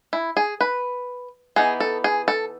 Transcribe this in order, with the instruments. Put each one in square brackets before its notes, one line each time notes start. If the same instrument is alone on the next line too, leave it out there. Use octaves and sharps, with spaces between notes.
[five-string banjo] E4
G#4
B4
E3 B3 D#4 G#4
A4
G#4
A4